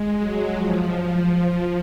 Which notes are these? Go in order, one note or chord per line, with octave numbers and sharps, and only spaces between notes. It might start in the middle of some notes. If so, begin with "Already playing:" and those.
Already playing: G#3
F#3
F3